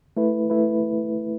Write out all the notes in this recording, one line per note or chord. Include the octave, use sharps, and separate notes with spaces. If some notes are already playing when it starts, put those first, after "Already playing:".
A3 E4 B4
A3 E4 B4